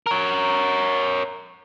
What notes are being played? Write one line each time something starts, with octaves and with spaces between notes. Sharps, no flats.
A#4 C#5